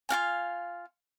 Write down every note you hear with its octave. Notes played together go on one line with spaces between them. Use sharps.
F4 F#4 F5 G#5